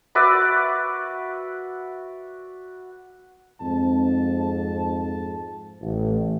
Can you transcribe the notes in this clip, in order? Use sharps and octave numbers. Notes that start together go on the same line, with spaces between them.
F#4 B4 D5 E5
F2 G#2 C4 A5
A1